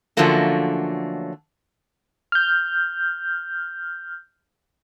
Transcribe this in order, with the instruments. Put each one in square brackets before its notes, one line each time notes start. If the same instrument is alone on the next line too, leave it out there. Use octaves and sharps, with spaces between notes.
[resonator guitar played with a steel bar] D3 F3 F#3 A3 A#3 C#4
[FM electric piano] F6 G6